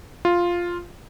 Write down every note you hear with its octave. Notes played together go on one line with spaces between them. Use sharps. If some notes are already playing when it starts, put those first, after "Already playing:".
F4